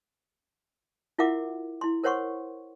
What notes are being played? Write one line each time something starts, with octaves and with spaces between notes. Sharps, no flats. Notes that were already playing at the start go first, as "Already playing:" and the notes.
E4 F4 A#4 E5 F#5 D6
E4 C6
A#4 C5 C#5 F#5 C6 C#6